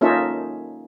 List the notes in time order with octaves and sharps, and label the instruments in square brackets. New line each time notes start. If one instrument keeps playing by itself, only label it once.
[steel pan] A#3 C#4 D#4 F4 A4 E5